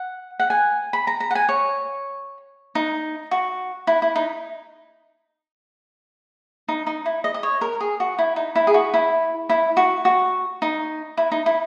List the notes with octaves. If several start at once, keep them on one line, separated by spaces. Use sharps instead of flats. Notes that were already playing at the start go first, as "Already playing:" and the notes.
Already playing: F#5
F#5
G#5
B5
A#5
A#5
F#5
G#5
C#5
D#4
F#4
E4
E4
D#4
D#4
D#4
E4
D#5
D#5
C#5
A#4
G#4
F#4
E4
D#4
E4
G#4
F#4
E4
E4
F#4
F#4
D#4
E4
D#4
E4